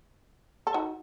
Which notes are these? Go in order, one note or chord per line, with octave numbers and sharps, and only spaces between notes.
A4
D#4 F#4